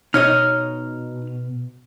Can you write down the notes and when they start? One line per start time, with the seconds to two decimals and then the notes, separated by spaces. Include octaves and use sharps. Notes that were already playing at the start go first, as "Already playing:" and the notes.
0.14 B2 D#4 C#5 D#5 F6